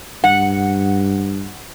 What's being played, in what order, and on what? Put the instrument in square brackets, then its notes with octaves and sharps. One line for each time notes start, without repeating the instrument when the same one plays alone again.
[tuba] G2 [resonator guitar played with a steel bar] F#5